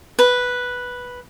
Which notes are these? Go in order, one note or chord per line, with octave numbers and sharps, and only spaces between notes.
B4